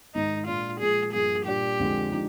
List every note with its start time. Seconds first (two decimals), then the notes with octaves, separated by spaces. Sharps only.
0.15 G#2 D#3 G#3 D#4
0.47 A#2 G#3 D4 F4
0.80 A#2 F3 G#3 G#4
1.13 G2 F3 A#3 G#4
1.46 A#2 G3 D4 G4
1.79 F2 D3 F3 G#3
2.12 D3 F3 G#3 D#4